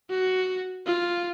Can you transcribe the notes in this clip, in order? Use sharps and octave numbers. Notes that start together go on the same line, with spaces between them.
F#4
F4